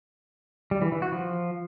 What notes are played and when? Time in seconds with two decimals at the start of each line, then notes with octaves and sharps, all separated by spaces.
0.71 G3
0.82 E3
0.92 E3
1.02 F#4
1.12 F3